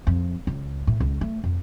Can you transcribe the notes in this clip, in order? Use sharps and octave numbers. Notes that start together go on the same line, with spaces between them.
F2
C#2
A2
C#2
A3
F2